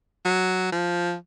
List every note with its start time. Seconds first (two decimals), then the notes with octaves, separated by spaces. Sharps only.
0.25 F#3
0.72 F3